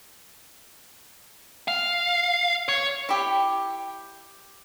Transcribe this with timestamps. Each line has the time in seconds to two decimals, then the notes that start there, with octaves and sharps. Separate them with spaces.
1.68 F5
2.68 C#5
3.09 E4 G4